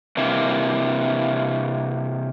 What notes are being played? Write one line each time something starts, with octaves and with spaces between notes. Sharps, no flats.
C3 E3 A#3